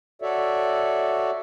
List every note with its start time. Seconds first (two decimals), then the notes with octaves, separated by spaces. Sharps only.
0.22 F#4 A4 C#5 D5 E5